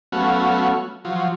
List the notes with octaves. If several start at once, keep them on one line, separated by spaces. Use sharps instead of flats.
F#3 A3 B3 C#4 F#4 F5
F3 F#3